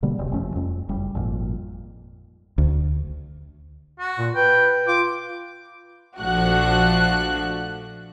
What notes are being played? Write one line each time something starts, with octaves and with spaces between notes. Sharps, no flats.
B2 D3 G3 A#3
E1 C3
F#1 F2 A3 C#4
F2
F#1 G3
G#1 F2 A#2
D2
F#4
A#2
B4 G5
F4 D6
A#1 F3 A3 D4 F#4 F#6